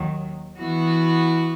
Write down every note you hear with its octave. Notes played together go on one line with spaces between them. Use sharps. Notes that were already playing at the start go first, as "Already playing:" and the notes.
Already playing: D#2 D#3 F#3
E3 B3 F#4